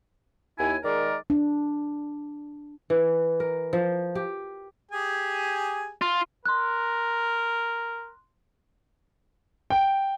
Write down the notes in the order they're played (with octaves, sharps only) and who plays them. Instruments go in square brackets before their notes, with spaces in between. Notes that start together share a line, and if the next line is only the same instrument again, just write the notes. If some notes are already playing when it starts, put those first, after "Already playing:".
[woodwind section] D#2 E4 G#5
D#3 G#3 G#4 A#4 D5
[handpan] D4
[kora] E3
A#4
F3
G4
[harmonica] G4 G#4 G#5
[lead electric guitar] F4
[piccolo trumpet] A#4 [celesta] C6 F#6
[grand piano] G5